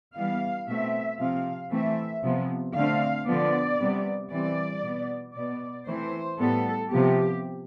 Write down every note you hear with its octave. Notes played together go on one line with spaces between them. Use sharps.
E3 G3 B3 F5
B2 A3 C4 E5
C3 F3 C4 F5
E3 A3 C4 E5
C3 F3 B3
D3 A3 C4 F5
D3 F3 B3 D5
C3 G3 B3
E3 G3 C4 D5
B2 B3
B2 B3 D5
E3 A3 C4 C5
A2 G3 B3 A4
C3 F3 B3 G4